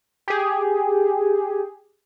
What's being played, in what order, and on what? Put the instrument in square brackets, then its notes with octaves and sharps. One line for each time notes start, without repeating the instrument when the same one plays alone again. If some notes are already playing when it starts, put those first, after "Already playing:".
[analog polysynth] G4 G#4